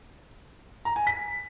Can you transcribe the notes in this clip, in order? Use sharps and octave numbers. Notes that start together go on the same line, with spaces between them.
A#5
G#5
B6